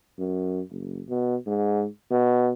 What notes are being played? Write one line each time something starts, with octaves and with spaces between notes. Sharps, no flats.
F#2
F#1
B2
G#2
B2